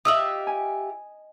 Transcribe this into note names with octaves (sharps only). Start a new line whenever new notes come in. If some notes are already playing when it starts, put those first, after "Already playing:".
F4 G4 D#5 E5 D#6 E6 F#7
G#5